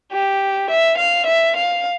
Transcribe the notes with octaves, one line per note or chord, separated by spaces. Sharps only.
G4
E5
F5
E5
F5